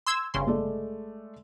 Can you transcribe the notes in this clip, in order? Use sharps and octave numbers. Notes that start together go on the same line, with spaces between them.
C6 E6 G#6
G1 C#3 C6
G#3 A3 D5